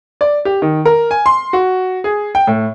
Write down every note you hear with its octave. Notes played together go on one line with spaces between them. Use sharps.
D5
G4
D#3
A#4
G#5
C6
F#4
G#4
G5
A2